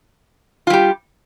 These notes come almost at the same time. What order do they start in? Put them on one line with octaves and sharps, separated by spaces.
F4 G3 G4